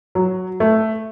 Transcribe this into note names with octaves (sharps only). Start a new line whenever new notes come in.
F#3
A3